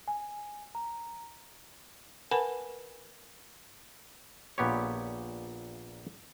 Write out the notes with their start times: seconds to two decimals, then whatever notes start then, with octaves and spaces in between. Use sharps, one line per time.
0.08 G#5
0.75 A#5
2.31 A#4 B4 F#5 G#5 A5 B5
4.58 A#1 A#2 B3 G4 C#5